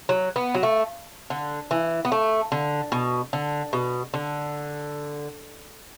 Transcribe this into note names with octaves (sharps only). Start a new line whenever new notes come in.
F#3
B3
F#3
A3
D3
E3
B3
A3
D3
B2
D3
B2
D3